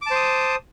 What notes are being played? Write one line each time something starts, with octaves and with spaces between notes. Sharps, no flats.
C5 A5 D6 D#6